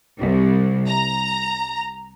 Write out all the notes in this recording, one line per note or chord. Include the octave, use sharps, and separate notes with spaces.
C2
A#5